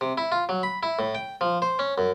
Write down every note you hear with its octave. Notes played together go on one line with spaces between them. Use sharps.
C3
E4
F4
F#3
B5
E4
A2
G5
F3
C5
C#4
F#2